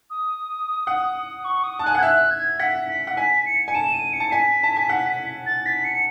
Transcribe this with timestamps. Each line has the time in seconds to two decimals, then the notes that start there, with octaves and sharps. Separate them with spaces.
0.10 D#6
0.87 F#5
1.45 C#6
1.64 D#6
1.79 A5
1.83 G#5 F#6
1.95 F#5
1.98 G#6
2.02 E5 F#6
2.31 G#6
2.60 F#5 B6
2.89 B6
3.07 F#5
3.17 G#5 B6
3.46 C#7
3.68 G#5
3.74 A5 E7
3.93 D#7
4.13 C#7
4.20 A5
4.32 G#5 B6
4.63 A5
4.76 G#5
4.89 F#5
5.46 A6
5.66 B6
5.85 C#7